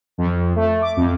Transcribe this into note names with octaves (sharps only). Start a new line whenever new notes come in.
F2
A3
D6
F2